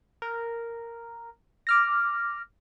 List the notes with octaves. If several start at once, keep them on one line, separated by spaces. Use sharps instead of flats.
A#4
D6 F6 A#6